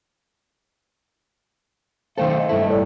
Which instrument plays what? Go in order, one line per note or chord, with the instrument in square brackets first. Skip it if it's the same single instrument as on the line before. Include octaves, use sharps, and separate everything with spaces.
[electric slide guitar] D#3 A3 A4 [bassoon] C4 [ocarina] F5
[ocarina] D#5
[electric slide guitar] G2 E4 [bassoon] A3
[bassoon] A2 [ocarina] D5